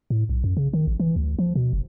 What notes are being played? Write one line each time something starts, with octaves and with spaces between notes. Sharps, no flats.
A2
B1
F#2
C#3
D#3
A1
E3
D2
F3
B2
F#1